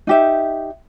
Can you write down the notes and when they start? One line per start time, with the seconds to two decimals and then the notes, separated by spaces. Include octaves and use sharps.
0.07 D#4 G4 E5